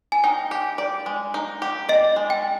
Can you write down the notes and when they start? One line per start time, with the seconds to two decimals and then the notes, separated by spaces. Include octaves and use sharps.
0.12 G#5
0.24 D#4 G5
0.51 G4
0.78 D5
1.06 G#3
1.34 D#4
1.62 G4
1.89 D5 D#5
2.16 G#3
2.30 G5